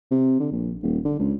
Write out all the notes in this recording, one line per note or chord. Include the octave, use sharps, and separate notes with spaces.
C3
D3
A#1
D#1
D3
C#2